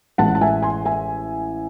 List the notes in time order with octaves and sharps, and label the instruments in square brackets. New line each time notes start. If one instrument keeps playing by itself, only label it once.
[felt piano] A1 A2 G#3 F#5 A5
A5
E5 G#5
G#5 C6
E5 G#5